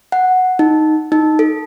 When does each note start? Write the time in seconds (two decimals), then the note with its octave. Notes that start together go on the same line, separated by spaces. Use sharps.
0.12 F#5
0.59 D#4
1.12 D#4
1.39 A4